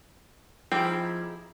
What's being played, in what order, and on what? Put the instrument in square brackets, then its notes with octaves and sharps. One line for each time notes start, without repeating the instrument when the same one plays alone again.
[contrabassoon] F3 [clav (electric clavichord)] G3 C4 [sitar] D#4 E4 G#4 [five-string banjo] G5